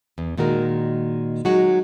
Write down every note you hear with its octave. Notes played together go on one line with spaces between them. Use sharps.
E2
A#2 D#3 G#3 F#4 A#4
F#3 G#3 D#4 F#4